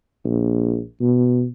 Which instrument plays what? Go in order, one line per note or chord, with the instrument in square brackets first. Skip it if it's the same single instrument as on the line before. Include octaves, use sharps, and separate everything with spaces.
[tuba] A#1
B2